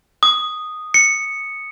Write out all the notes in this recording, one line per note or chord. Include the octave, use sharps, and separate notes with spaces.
D#6
C#7